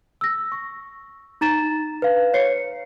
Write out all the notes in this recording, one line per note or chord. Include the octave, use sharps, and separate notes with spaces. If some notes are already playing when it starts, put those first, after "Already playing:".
E6 A#6
C#6
D#4 A#5 A6 E7
B4 F5
C#5 C7 C#7